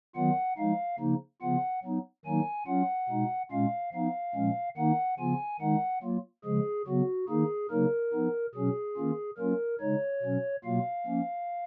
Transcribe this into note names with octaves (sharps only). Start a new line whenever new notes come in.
D#3 F#3 B3 F4 F#5
F3 G#3 D#4 F5
C#3 F3 A#3 D#4
C#3 F3 B3 F4 F#5
F#3 B3 D#4
D#3 F#3 A#3 D#4 G#5
F#3 C#4 F4 F#5
B2 G#3 D#4
A#2 G#3 C#4 F4 F5
F3 B3 D#4 F5
A#2 F3 G#3 C#4
D#3 A#3 D#4 F#5
C#3 F3 B3 F4 G#5
D#3 G#3 D#4 F#5
F#3 A#3 F4
C#3 F3 G#3 G#4
C#3 F#3 B3 F#4
D#3 A#3 D#4 G#4
C#3 F#3 A#3 D#4 A#4
F3 B3 D#4
B2 F#3 C#4 G#4
D#3 A#3 C#4 F4
F#3 A#3 C#4 F4 A#4
C#3 G#3 D#4 C#5
B2 F#3 C#4
B2 F#3 A#3 F4 F5
F3 A#3 C#4